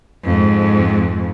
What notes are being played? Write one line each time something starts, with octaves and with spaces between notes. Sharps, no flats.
F2 G#2